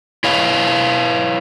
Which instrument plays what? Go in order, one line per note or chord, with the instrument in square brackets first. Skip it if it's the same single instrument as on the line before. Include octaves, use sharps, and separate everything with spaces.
[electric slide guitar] E4 B4 C#5 F5